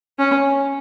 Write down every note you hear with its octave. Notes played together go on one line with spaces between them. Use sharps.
C#4